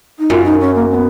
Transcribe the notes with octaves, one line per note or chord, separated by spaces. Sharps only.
D#4
F#2 F4
D#4
C#4
A#3
C#4
B3